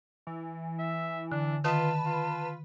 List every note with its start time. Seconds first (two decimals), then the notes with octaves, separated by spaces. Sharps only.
0.27 E3
0.79 E5
1.32 D3 D4
1.64 D#3 F4 B4 D#5 A5 D#6
2.05 F4